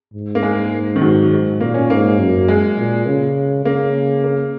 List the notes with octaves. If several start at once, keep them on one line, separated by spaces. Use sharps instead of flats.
G#2
A#3
G#3
D#3
G#2 F#3
G#2
A#2 A#3
C#4
G#2 A#3
F#2
G#3
A#2
C#3
C#3 A#3
A#3